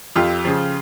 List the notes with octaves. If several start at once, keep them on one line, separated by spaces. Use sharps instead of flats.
F2 F4 G4
C#3 F3